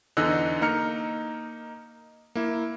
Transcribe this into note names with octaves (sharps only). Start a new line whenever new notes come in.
E2 D3 D#4 D#5 E6 F#6
A#3 D#4 A#5 F6 C#7
A#3 E4